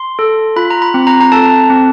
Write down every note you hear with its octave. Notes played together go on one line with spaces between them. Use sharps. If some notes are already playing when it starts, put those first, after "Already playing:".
Already playing: C6
A4
F4 B5
A#5
B5
C4
A#5
A#5
A4 A5
C4